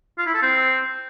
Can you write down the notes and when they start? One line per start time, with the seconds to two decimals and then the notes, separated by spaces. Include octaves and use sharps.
0.18 F4
0.26 E4
0.34 A4
0.42 C4